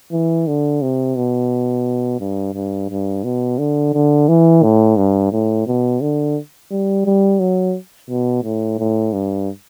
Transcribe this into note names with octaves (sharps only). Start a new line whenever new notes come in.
E3
D3
C3
B2
G2
G2
G2
B2
D3
D3
E3
A2
G2
A2
B2
D3
G3
G3
F#3
B2
A2
A2
G2